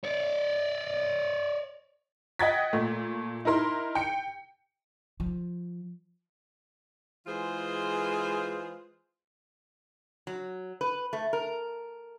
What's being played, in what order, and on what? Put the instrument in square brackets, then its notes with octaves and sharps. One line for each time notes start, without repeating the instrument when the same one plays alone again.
[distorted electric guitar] C#5 D5
[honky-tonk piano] D#5 F#5 G5 G#6 A6 B6
A#2 A3
D#4 E4 A#4 C6
G5 C#7
[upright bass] F3
[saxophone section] E3 G#3 F4 G#4 B4 C5
[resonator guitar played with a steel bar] F#3
B4
A3
A#4